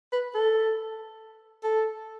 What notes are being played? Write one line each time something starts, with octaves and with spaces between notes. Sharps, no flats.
B4
A4
A4